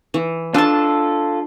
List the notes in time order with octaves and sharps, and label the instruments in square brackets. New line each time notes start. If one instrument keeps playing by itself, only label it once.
[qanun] E3
[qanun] D4 A5 [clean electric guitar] F4 A4